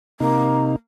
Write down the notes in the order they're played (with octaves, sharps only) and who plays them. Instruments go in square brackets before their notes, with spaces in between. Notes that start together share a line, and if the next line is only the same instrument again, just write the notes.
[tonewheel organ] C3 D#4 [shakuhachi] A#3